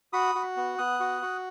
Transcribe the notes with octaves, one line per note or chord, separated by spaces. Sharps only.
F#4 B5 D#6
F#4
B3
B3 D#6 F#6
F#4
F#4